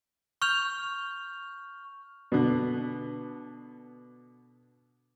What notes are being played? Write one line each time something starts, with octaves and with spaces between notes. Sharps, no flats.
C#6 F6 G6 F7
B2 D3